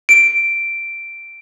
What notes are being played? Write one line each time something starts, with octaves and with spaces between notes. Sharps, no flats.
D7